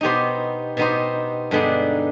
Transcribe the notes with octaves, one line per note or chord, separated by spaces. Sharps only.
B2 B3 D#4 G4 C5
B2 B3 D#4 G4 C5
G2 D3 G#3 B3 D#4